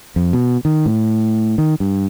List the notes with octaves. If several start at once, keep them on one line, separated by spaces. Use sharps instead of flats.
F2
B2
D#3
A2
D#3
G2